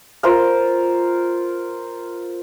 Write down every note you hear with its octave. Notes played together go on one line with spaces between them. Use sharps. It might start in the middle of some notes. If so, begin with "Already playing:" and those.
F4 A#4 C5 F5